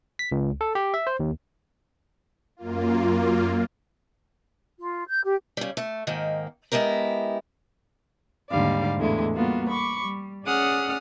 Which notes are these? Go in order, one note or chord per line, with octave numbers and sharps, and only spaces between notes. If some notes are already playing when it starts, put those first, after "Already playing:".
B6
C#2
A4
G4
E5
C5
D#2
F#2 A#3 F4
F4
G6
G4
C#3 G3
A3
G#2 D#3 A#3
G#3 B3 E4 G4 A#4
D#2 G#2 D3 G3 D5 F5
E2 A2 D3 G#3 E4
G3 A#3 B3 F4 F#4
B5 C#6 D6
G3
C#4 G#4 D5 F#5 D#6 F6